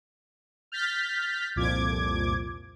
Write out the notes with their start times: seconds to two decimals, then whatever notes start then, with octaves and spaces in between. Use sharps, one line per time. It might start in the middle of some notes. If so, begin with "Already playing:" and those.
0.72 F6 G6 A6 B6
1.56 C2 F2 A#2 F3 D6 G#6